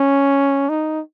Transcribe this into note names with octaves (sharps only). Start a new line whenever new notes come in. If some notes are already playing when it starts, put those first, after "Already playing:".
Already playing: C#4
D#4